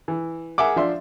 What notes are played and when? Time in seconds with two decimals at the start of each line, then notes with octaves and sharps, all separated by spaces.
0.08 E3
0.58 G#4 A#4 E5 F#5 D6
0.76 F3 D4 E5 C6